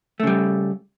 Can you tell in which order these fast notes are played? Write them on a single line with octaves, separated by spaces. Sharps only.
A3 C#3 G3